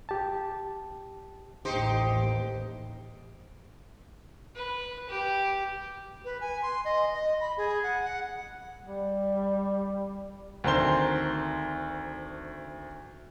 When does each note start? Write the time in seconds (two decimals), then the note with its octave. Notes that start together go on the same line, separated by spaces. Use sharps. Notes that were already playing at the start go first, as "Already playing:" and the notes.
0.09 G4 A5
1.65 A1 D#2 D#4 G4 C5
4.55 B4
5.09 G4
6.25 B4
6.41 G#5
6.62 C6
6.85 D#5
7.14 D#5
7.40 B5
7.57 G#4
7.83 F#5
8.04 F#5
8.83 G3
10.64 D2 D#3 C4 A#4 C6 G7